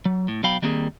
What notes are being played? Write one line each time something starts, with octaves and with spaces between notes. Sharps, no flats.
F#3
A2
B1 B2 F#3 F5 G5 B5
D#3 G3 A#3 C4 G4 G#4